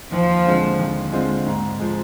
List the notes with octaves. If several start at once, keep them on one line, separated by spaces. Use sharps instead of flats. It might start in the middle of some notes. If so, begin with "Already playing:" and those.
D#2 F3
D3 G#3 C4 F4
D#2
D3 G#3 C4 F4
G#2
F3 G#3